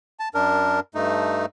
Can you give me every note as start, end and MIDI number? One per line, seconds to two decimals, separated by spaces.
0.19 0.29 81
0.34 0.80 42
0.34 0.80 62
0.34 0.80 70
0.95 1.46 43
0.95 1.46 57
0.95 1.46 63